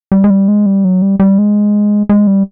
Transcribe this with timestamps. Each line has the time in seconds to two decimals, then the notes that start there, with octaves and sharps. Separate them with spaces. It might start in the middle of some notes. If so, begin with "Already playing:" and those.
0.12 G3
0.24 G#3
0.30 G3
0.48 G#3
0.66 G3
0.84 F#3
1.02 G3
1.20 G3
1.38 G#3
2.09 G#3
2.27 G3